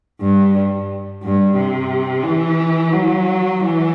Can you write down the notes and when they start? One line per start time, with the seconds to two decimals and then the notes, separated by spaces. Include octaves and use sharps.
0.21 G2
1.23 G2
1.57 C3
2.24 E3
2.93 F#3
3.60 E3